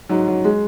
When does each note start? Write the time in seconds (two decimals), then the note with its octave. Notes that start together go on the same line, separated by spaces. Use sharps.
0.09 G#2 F#3
0.27 F#3
0.44 G#3